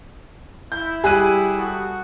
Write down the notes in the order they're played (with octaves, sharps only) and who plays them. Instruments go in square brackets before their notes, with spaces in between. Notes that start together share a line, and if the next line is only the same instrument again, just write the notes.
[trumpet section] E4 [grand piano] G6
[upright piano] G3 F#6 D#7 [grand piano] G4 G#4
[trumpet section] F#4 A4 D#6